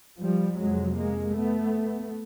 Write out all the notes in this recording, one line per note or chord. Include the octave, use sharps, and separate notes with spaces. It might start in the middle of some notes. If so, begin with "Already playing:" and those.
F3 G3
F2 C3 F#3 G#3
G#3 A#3
A3 B3